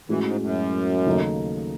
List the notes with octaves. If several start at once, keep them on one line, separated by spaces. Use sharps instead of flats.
A2 E3 G#3 C#4 F#4
G#2
F#2
D#2 C#3 F#3 A3 D#4